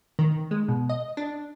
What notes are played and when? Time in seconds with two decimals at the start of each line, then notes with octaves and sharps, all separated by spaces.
0.19 D#3
0.51 G#3
0.69 B2
0.89 D#5
1.17 D4